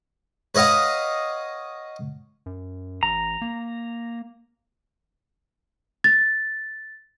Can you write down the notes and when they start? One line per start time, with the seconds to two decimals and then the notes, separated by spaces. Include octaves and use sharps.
0.55 B4 C#5 D#5 F5 F#5
2.46 F#2
3.03 A1 A#5
3.42 A#3
6.04 A6